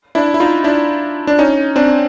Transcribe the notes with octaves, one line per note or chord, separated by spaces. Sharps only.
D4 E4
E4
D#4 F4
D4 E4
D4
C#4 D#4
C4 D4